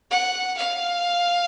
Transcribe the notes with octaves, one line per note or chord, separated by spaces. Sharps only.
F#5
F5